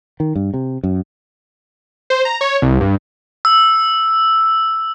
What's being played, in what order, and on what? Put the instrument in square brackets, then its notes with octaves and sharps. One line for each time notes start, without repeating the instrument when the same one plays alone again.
[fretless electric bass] D#3
G2
C3
F#2
[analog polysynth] C5
A#5
C#5
C2
G2
[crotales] E6